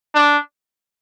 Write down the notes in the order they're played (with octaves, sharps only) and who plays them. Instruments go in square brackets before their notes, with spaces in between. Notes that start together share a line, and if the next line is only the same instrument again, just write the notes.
[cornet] D4